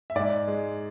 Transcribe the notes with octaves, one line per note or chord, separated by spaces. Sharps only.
E5
G#2 D5
G#3